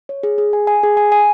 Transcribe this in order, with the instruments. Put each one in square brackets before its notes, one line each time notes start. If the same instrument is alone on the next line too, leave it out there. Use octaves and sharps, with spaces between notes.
[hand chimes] C#5
G#4
G#4
G#5
G#5
G#4
G#5
G#5